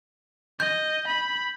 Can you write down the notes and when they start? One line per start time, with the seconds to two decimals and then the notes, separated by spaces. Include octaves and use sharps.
0.60 D#5 G6
1.07 B5